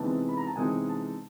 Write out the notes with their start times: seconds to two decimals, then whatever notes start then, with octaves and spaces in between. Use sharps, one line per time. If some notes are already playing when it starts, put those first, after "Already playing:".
Already playing: C3 E3 G#3 B3 D#4 A5
0.29 B5
0.37 A#5
0.47 A5
0.56 C3 E3 G#3 B3 D#4 G#5
0.89 A5